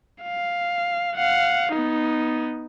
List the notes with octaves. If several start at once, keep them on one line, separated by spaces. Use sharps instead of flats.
F5
F5 F#5
B3 D#4